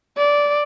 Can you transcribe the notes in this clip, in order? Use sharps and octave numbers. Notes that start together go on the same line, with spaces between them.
D5